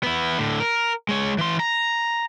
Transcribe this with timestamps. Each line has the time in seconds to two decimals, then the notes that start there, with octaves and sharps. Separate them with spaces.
0.03 B3 E4
0.38 A2 D3
0.60 A#4
1.09 G#3 C#5
1.38 E3 C6
1.60 A#5